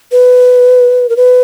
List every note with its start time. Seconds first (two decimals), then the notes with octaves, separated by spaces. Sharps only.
0.12 B4
1.09 A#4
1.17 B4